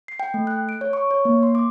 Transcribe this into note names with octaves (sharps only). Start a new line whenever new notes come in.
C7
G5
A3
F#6
D7
C#5
C#6
C#5
A#3
C6
D6